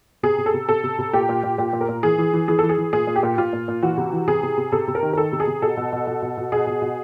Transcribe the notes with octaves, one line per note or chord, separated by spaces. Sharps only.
C3 G#4
C3
A4
C3
C3 A4
C3
C3
A#2 G4
A#2
A#2
A#2 G4
A#2
A#4
A#2
E3 G#4
E3
E3
E3 G#4
E3 A4
G#4
E3
A#2 G#4
A#2
G4
A#2
A#2 F4
A#2
A#2
E3 F#4
C3
E3
C3 G#4
C3
C3
C3 A4
C3
A#4
D#3
A#4
D#3 A4
C3
G#4
C3
B2 A4
B2
B2
B2
B2
B2
B2 G#4
B2
B2